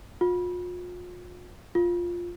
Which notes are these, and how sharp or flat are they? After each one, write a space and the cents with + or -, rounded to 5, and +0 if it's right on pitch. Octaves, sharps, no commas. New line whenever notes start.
F4 +40
F4 +5